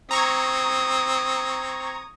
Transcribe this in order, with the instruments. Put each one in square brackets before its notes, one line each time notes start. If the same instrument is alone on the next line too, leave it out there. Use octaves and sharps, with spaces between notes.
[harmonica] C4 [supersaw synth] A#5 C#6 G#6 [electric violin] D#6